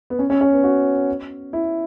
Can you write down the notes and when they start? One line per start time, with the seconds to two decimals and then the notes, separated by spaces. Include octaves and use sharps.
0.10 B3
0.19 C#4
0.30 C#4
0.41 C#4
0.53 B3
0.64 F#4
1.53 E4